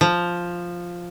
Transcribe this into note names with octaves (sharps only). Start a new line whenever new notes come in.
F3